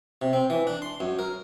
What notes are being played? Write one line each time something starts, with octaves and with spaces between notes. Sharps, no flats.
C3
C4
E3
D4
C6
F#2
A#4